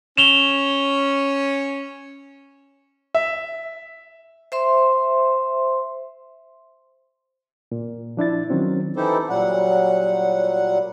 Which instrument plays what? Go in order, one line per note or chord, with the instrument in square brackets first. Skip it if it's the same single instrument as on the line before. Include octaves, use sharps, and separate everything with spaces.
[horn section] C#4 [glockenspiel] E7 F7 G7
[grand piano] E5
[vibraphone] C5 E5 C6
[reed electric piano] A#2
F3 D4 E4 A6
D#3 F#3 C4 C#4
[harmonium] E3 D#4 E4 G4 A4 C5
A#2 F#3 G3 F#5